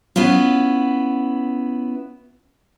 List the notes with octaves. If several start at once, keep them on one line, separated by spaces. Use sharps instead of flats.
B3 C#4 E4 F4